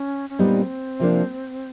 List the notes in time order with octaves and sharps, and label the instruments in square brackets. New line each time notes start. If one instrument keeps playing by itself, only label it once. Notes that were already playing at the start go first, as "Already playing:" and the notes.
Already playing: [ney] C#4
C#4
[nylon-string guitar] A#2 G3 B3 D#4 [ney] C4
[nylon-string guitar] C3 F3 A#3 D4